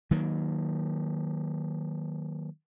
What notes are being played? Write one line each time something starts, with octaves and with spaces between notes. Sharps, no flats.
D#3 F#3 A#3